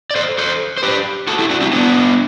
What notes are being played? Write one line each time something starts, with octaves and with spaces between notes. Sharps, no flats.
D5
A4 C5
A4 C5
C5
G4 B4
F#4 A4
E4 G4
D4 F#4
C4 E4
B3 D4